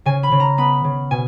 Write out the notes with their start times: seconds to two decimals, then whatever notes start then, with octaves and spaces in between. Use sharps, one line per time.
0.05 C#3 G#5
0.23 B5
0.31 C#3
0.40 A#5
0.58 B3 B5
0.84 C#3
1.11 B2 G#5